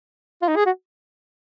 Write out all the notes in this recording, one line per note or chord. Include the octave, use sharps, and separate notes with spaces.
F4
D#4
G#4
F#4